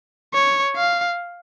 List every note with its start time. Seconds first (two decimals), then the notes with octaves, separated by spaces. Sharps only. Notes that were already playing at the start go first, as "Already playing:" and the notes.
0.34 C#5
0.76 F5